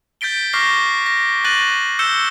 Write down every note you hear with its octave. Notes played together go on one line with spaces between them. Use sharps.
G6 A6 B6 D7 G7
C#6 D6 F6 A#6 C7 G7
A#6
C#6 F#6 A6 A#6 D#7 F#7
E6 G6 C#7 E7 G7